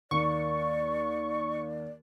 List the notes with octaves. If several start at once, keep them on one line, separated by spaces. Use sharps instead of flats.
D#2 A#3 D5 C#6